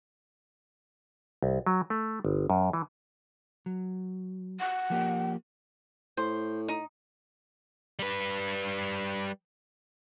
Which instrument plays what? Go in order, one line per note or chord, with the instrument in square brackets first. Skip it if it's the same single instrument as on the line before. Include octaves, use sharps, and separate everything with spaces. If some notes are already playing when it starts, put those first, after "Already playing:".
[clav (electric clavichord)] C2
F#3
A3
G1
F#2
E3
[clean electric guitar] F#3
[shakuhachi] F#5
[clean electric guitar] F3 A#3 G4
[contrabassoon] A2 [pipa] C5
[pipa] D#4
[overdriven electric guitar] G3 B4